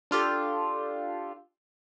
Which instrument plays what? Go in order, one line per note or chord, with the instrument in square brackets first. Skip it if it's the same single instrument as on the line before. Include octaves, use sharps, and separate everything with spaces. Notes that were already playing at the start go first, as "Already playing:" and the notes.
[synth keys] D4 F4 G4 A4